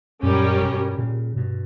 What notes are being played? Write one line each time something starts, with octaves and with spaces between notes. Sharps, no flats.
F#2 A#2 G3 C#4 G4 A#4
G2 B2
A#2 C#3
G2 B2